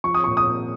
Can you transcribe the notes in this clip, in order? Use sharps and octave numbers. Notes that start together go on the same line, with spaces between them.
F3 C#6
D#6
A#2 C#6
D#6
A#2